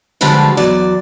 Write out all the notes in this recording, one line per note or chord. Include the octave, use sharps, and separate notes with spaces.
D2 D3 F3 G3 G#3 B4
E2 F#3 D5